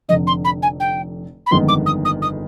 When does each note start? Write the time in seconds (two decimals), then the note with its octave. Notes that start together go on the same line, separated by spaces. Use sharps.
0.08 F1 F2 D3 D#5
0.27 C6
0.45 B5
0.63 G#5
0.80 G5
1.46 B5
1.51 G1 F2 D#3 G#3 B3 C6
1.68 D6
1.86 D#6
2.05 D#6
2.22 D#6